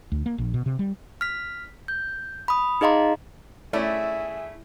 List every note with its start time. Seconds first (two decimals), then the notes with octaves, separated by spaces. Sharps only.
0.12 D2
0.26 A#3
0.38 A#1
0.54 B2
0.66 C3
0.79 G3
1.21 F6 B6
1.88 G6
2.48 B5 D#6
2.81 D#4 G#4 D#5 F5 A#5 C6
3.73 A3 C#4 E4 G#4 D5 E5